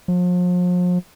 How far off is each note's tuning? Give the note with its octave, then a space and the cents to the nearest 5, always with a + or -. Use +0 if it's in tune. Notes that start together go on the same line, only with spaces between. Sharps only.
F3 +40